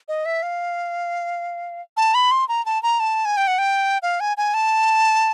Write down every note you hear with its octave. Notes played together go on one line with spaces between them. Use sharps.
D#5
E5
F5
A5
B5
C6
A#5
A5
A#5
A5
G#5
G5
F#5
G5
F5
G#5
G#5
A5